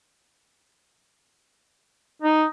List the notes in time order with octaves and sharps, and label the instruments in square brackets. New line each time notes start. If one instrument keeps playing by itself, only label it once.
[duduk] D#4